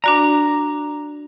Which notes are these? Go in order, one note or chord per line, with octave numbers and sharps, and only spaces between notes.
D4 F#4 D5 A#5